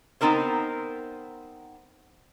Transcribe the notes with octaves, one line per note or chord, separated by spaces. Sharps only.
B3 C4 D#4 A#4 C5